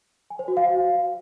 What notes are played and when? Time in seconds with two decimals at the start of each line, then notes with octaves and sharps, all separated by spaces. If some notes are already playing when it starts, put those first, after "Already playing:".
0.30 G#5
0.39 C5
0.48 F#4
0.57 F5